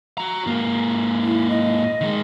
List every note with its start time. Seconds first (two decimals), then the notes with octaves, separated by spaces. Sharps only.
0.18 F#4 A#5
0.47 G#2 A#3
1.23 E4
1.50 D#5
2.01 D#3 G#3